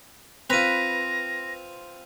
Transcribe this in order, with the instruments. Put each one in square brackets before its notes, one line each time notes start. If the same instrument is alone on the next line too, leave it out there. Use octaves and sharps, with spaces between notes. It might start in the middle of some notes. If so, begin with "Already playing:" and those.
[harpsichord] C4 F4 [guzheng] B4 [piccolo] A#6 [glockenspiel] D#7 F7